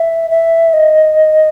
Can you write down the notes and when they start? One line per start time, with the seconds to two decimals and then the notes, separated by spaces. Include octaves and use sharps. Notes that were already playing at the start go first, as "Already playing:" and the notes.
Already playing: E5
0.31 E5
0.73 D#5